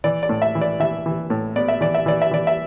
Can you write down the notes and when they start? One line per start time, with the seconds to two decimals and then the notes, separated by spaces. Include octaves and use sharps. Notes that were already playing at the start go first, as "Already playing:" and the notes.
0.04 E3 D5
0.23 D5
0.29 A2
0.42 E5
0.55 E3
0.61 D5
0.80 E3 E5
1.06 E3
1.30 A2
1.56 B3 D5
1.68 E5
1.81 E3 D5
1.95 E5
2.06 E3 D5
2.22 E5
2.31 E3 D5
2.47 E5